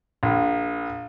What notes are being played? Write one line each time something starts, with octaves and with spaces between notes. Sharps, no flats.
A#1